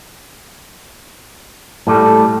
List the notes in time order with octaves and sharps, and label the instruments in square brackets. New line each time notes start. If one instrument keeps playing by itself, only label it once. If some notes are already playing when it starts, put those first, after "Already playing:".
[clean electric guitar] A2 G3 A3 [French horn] A4